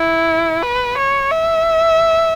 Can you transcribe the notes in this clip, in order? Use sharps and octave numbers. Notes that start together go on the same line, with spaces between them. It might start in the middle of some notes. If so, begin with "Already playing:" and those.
Already playing: E4
B4
C#5
E5